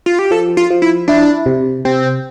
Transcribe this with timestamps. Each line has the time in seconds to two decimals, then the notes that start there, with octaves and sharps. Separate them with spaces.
0.06 F4
0.19 G4
0.31 F3 A4
0.57 F4
0.70 F3
0.82 E4
1.08 D4 E4
1.46 C3
1.85 C3 C4